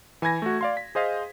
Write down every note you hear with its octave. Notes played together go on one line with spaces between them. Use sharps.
E3 G#5 B5 G#6 A#6
A3 F#4
D5 F5 C6
B6
G#4 C5 D#5 F5